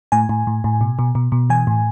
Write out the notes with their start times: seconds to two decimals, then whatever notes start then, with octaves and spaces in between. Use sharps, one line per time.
0.12 A2 G#5
0.29 A2
0.47 A2
0.64 A2
0.81 B2
0.99 B2
1.15 B2
1.32 B2
1.50 E3 G#5
1.67 A2